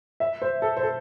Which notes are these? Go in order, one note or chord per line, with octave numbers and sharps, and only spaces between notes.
E5
C5
A4
C5
A4